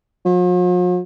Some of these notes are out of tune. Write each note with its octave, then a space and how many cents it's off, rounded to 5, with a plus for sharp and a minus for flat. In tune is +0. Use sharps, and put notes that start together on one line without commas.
F3 +45